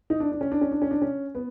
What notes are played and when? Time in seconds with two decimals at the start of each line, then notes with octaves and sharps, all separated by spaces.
0.10 D#4
0.20 D4
0.32 D4
0.41 C#4
0.52 D4
0.61 C#4
0.72 D4
0.82 C#4
0.91 D4
1.02 C#4
1.35 B3